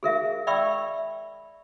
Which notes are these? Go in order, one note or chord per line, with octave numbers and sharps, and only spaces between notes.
G#4 A#4 E5 F5
D5 E5 G5 B5 C#6 E6